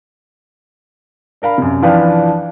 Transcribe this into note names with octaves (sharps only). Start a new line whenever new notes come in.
D4 A#4 F5 B5
F#2 C3
E3 F3 D4 B4 F5 G5